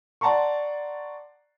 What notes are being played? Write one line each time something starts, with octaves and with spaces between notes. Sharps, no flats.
D5 F#5 A5 A#5 C6 C#6